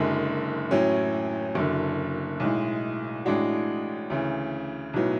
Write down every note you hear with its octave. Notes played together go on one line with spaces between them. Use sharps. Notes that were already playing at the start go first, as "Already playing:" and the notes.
Already playing: F#1 F#2 D3 G#3
A1 A2 F#3 C#4
F#1 F#2 D3
B1 A2 G#3
A1 A2 G#3 D4 F#4
D2 C#3 E3
B1 A2 F#3 B3